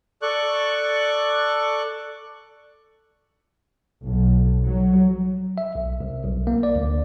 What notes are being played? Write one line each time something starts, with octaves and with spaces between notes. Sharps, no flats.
A4 D5 C#6 F#6
B1
F#3
E5
B1
C2
B1
A#3
D5
D2